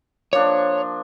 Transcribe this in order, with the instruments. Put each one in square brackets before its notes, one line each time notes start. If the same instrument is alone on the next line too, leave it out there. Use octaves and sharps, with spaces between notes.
[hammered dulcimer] F3 A#3 D4 [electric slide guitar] C#5